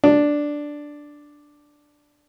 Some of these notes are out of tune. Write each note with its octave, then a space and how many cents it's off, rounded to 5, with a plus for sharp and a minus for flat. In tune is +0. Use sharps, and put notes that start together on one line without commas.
D4 +0